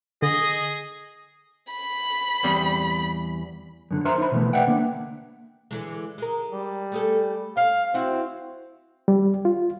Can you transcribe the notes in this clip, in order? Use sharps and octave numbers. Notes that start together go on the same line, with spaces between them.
D3 G#4 D#5
B5
E2 G3 C4
F#2 D3
A#4 C5 E5 A#5 C6
D#4 C5 B5
B2 E3 A3
B4 D5 E5 F#5 G5
D3 A#3
D3 E3 G#3
G#3 A#4
G3
A3 G#4 A4
C#4 F5
C4 E4 F#4
G3
F4